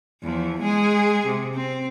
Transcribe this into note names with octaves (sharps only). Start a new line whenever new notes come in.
E2 F3
G#3 G#4
C3
C4